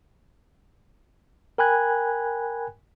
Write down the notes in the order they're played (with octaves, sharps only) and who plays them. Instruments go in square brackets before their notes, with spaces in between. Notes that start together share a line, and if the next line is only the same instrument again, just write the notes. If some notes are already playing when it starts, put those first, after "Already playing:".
[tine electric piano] A#4 G5 G#5 B5 F#6 G#6